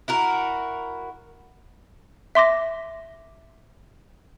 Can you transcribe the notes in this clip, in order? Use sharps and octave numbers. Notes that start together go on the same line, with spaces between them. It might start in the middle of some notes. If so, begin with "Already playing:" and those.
E4 F#4 A#4
E5 C6 D6 A#6